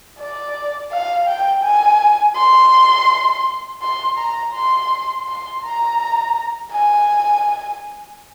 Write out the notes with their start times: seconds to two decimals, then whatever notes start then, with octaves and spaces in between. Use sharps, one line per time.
0.20 D5
0.92 F5
1.28 G5
1.64 G#5
2.37 C6
3.82 C6
4.18 A#5
4.54 C6
5.28 C6
5.64 A#5
6.72 G#5